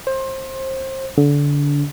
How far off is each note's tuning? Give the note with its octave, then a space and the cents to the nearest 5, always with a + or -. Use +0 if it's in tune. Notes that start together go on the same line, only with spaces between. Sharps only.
C5 +25
D3 -25